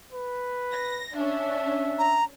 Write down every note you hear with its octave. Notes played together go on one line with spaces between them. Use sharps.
B4
A#6
C#4 D4 E5
A#5